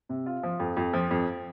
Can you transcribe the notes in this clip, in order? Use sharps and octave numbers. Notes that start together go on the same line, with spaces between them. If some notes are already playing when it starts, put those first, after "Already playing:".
C3
F4
F3
F2
F2
F3
F2